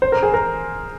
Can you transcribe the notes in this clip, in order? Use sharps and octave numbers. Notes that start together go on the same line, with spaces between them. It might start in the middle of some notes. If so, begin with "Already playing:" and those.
C5
A#4
G#4
A#4